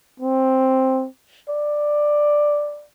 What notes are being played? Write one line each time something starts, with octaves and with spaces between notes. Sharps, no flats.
C4
D5